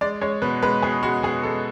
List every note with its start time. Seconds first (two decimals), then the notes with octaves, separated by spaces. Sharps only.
0.01 G#3 D5
0.21 G#3 C#5
0.42 B2 B4
0.62 G#3 B4
0.82 B2 G#4
1.03 G#3 F#4
1.23 B2 G#4
1.43 G#3 A4